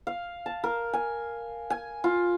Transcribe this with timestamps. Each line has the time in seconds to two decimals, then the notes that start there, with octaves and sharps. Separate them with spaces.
0.07 F5
0.46 A5
0.64 A#4
0.93 G#5
1.70 G#5
2.04 F4